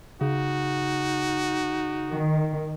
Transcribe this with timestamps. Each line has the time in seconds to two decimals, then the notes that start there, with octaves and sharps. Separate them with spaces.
0.21 C#3 D#4 F#4
2.10 D#3